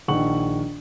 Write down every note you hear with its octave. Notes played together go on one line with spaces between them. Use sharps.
A#1 D#3 F#5 C#6 F#7